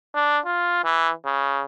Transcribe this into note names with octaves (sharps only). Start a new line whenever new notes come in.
D4
F4
E3
C#3